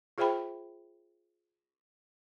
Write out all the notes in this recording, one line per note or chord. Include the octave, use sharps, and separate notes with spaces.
F4 G#4 C5 E5 G5 B5